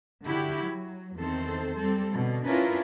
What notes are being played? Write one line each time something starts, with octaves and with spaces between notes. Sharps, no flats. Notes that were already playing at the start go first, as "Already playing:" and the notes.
D3 E4 F#4 G4
F#3
E2 D#3 C4 A4 C5
G3 C4 A4
B2 D3
C#4 D4 E4 F4 A#4 B4